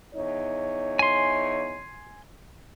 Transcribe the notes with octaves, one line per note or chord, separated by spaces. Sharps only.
E2 D#4 C#5
G#5 C6